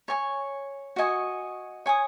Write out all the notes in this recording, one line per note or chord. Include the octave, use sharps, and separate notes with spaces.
C#5 G#5 C#6
F#4 D#5 G#5 C#6
C#5 G#5 D#6